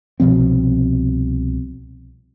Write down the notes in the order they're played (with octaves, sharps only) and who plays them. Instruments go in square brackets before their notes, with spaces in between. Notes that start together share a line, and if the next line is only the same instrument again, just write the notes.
[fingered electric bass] C2 B2 F3 C4